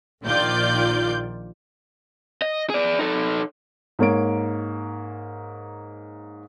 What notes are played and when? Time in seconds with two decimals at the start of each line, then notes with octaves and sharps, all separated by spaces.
0.24 A#1 D#3 F4 D5 G6
2.42 D#5
2.70 G#4 D5
2.99 D#4 A4
3.99 G#2 A#3 C#5 D7